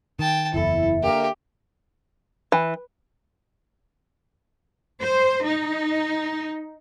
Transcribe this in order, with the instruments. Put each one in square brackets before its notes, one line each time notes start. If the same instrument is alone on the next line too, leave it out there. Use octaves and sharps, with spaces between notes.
[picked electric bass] D#3 [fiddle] G5 A5
[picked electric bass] F#1 E2 [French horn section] E4 [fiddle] A4 [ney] E5
[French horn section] D3 A#3 [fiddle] G4
[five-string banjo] E3
[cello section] C5
D#4